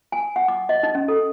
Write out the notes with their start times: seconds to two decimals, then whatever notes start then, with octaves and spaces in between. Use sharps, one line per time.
0.12 G#5
0.36 F#5
0.48 D6
0.69 D#5
0.83 D#4
0.95 C#4
1.08 A4